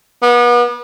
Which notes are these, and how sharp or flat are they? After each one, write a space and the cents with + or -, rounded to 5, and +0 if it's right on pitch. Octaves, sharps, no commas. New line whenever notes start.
B3 -35